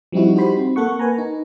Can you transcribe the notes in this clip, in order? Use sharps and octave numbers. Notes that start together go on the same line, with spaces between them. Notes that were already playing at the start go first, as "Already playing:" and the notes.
F3 G3 C4 D#4 E4 F#4
D#4 F#4 G4 C5 B5 C6
C4
A#3 A4 F#5 C#6
A#4 B4 G#5 A#5
D#4